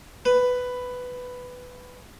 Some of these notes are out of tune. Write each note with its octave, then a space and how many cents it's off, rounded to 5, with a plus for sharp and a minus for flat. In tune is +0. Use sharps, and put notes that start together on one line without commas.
B4 +10